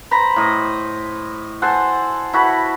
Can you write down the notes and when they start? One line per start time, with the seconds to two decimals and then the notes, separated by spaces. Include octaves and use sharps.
0.11 C5 A#5 B5
0.36 A2 D#5
1.62 A4 C5 F#5 G#5
2.33 E4 F#4 A4 B5